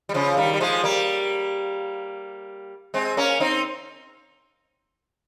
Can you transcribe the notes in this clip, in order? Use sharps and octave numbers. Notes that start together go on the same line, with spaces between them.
G3
C#3 F3
D#3 G3
G3
F3 G#3
G3 A#3
G#3 C4
A#3 C#4
C4 D#4